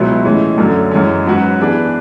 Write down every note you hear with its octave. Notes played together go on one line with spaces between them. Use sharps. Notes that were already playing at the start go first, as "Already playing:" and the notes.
Already playing: C#2 B2 F#3 B3 E4
A2 E3 G#3 C#4
F#2 D3 F#3 A3 C#4
F#2 E3 G#3 C#4
G#2 F#3 C#4 F#4 B4
E3 B3 D4 G#4 B4